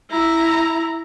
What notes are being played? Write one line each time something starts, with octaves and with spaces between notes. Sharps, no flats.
E4 A#5